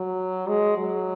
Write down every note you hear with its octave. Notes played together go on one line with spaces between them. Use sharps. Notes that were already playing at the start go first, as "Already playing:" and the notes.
Already playing: F#3
G#3
F#3